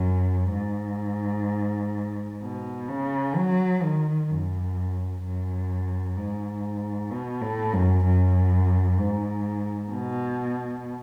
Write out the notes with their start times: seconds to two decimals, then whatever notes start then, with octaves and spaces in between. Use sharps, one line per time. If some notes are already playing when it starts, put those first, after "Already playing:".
Already playing: F#2
0.54 G#2
2.43 B2
2.88 C#3
3.36 F#3
3.82 D#3
4.30 F#2
5.23 F#2
6.17 G#2
7.11 B2
7.42 A2
7.73 F#2
8.04 F#2
8.98 G#2
9.91 B2